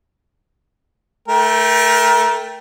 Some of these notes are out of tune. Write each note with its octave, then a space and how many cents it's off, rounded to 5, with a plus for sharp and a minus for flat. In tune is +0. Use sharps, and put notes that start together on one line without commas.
A3 +0 A#4 +30 G5 +0